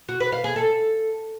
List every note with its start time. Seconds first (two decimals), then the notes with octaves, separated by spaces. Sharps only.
0.09 F#4
0.20 B4
0.32 F5
0.44 G#4
0.56 A4